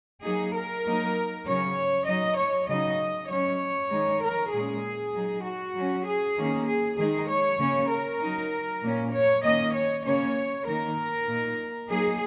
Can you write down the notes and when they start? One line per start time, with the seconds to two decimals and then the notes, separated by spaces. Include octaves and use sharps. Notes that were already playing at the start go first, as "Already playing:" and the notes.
0.23 F#3 A#3 D#4 G#4
0.54 A#4
0.85 F#3 A#3 D#4
1.46 C#3 F#3 C#4 C#5
2.07 F#3 D#4 D#5
2.38 C#5
2.68 C#3 F#3 D#4 D#5
3.29 F#3 C#4 C#5
3.90 D#3 G#3 D#4
4.22 A#4
4.52 A#2 G#3 C#4 G#4
5.14 F#3 D#4
5.44 F#4
5.75 F#3 C#4
6.05 G#4
6.36 D#3 A#3 C#4
6.67 G#4
6.98 D#3 G#3 D#4 G#4
7.28 C#5
7.59 C#3 A#3 C#4
7.90 A#4
8.20 F#3 D#4
8.82 A#2 A#3 C#4
9.12 C#5
9.43 D#3 A#3 C#4 D#5
9.73 C#5
10.04 C#3 A#3 C#4 C#5
10.66 D#3 A#3 D#4 A#4
11.27 A#2 A#3 D#4
11.88 F#3 A#3 D#4 G#4